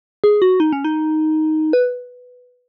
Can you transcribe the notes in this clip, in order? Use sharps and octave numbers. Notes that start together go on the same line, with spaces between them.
G#4
F#4
D#4
C#4
D#4
B4